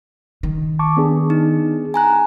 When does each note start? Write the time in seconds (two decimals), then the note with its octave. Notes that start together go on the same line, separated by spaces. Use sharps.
0.43 D#3
0.79 A5 C#6 D6
0.97 B3 D4 G#4
1.30 D#4
1.94 G#5 A#5 F#6